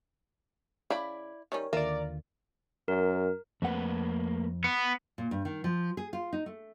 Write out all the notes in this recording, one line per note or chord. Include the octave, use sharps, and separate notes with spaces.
C#3 E4 D5 B5
D#3 G3 C#4 A#4 C#5
D#2 D3 F4 A#4 D5 E5
F#2 A#4
F2 A3 A#3 B4 F#5
B3
A#2
G2
D#3
F3
G#4
F4
D#4
A3